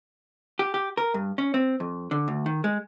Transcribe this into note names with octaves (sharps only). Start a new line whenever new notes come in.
G4
G4
A#4
G2
C#4
C4
F2
D3
D2
D#3
G#3